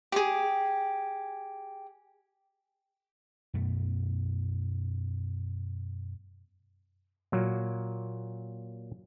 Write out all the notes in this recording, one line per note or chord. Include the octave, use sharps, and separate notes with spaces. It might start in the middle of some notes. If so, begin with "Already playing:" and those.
G4 G#4
F#2 B2 A3
A#2 F#3 A#3